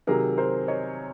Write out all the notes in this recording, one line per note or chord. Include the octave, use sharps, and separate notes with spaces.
C3 D#3 F#3 G#4 A#4
A#4 C5
C#5 D#5